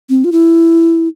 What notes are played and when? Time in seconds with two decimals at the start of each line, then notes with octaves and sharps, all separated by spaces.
0.10 C4
0.24 F4
0.32 E4